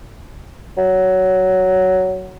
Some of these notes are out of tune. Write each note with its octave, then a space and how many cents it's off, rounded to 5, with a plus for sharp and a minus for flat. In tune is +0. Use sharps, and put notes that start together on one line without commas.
F#3 +10